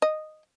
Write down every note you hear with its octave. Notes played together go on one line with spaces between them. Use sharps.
D#5